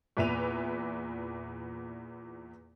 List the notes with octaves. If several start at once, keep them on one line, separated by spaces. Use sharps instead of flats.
E2 A#2 B4 E5 D#7 F7